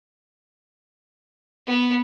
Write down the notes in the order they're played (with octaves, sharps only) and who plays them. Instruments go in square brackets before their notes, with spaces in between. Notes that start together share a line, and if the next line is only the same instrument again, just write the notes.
[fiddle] B3